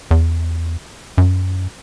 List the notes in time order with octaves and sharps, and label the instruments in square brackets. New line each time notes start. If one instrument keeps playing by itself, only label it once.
[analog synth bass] E2
F#2